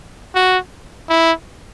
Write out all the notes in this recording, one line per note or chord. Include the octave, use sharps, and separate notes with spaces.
F#4
E4